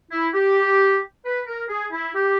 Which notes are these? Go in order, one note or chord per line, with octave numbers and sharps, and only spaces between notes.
E4
G4
B4
A#4
G#4
E4
G4